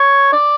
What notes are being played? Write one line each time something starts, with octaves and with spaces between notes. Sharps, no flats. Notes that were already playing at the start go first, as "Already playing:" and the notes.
Already playing: C#5
D5